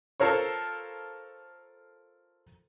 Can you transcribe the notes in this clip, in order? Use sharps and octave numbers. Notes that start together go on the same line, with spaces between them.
F4 A4 A#4 C5 C#5